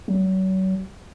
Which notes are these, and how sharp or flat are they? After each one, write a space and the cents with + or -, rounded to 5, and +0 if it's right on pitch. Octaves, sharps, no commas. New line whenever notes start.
F#3 +35